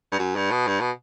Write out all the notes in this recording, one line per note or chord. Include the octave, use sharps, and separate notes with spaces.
G2
F#2
G2
B2
G2
B2